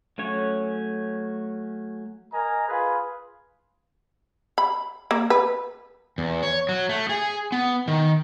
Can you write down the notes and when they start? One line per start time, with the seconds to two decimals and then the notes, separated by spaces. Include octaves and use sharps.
0.18 F#3 A3 C#4 C#5
2.33 A#4 D#5 G#5 A#5
2.68 F4 G#4 B4
4.58 B5
5.11 A#3
5.30 B4
6.18 E2
6.43 C#5
6.69 F#3
6.89 A3
7.09 G#4
7.52 B3
7.88 D#3